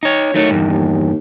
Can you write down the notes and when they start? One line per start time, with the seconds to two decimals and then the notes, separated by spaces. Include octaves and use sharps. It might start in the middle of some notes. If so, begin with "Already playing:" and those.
0.03 D#4 C#5
0.34 D#3 F#3 A3 C#5
0.50 E2 G2
0.70 D#2